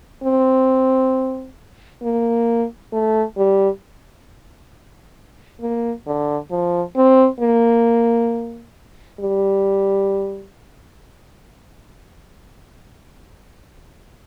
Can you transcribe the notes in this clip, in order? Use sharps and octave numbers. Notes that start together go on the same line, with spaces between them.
C4
A#3
A3
G3
A#3
D3
F3
C4
A#3
G3